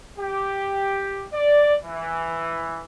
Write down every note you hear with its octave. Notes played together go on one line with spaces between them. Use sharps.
G4
D5
E3